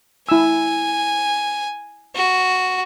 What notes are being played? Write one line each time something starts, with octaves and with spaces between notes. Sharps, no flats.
E4 G#5 E6
F#4